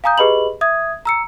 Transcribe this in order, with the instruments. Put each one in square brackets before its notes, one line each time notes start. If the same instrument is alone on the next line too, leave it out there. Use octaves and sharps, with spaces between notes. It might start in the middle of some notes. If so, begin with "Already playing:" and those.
[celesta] F5 G#5 A#5 D#6 G6
G4 G#4 B4 D#5 B5 F#7
E5 D#6 G#6
A#5 E6 C#7